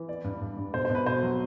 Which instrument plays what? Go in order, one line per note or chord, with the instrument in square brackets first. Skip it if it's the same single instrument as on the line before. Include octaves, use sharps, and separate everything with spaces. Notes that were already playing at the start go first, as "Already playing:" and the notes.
Already playing: [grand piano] E3
B3 D5
G2
G2
G2
B2 C5
C5
B2
B4
B2 C5
F#3